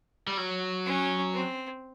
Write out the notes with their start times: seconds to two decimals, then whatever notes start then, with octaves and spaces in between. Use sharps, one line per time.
0.27 G3
0.37 F#3
0.86 C#4
1.34 C4